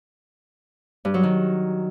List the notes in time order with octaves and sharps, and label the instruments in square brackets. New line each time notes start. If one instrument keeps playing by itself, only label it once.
[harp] G2
F#3
D#3